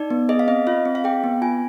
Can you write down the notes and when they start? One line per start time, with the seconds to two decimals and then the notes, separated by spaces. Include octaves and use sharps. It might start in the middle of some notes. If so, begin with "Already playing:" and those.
Already playing: D#4 D5
0.10 B3
0.29 G#4 D#5
0.39 F5
0.48 C4 D#5
0.67 F4 F5
0.85 C4
0.95 F5
1.04 G#4 G5
1.24 B3
1.42 F4 G#5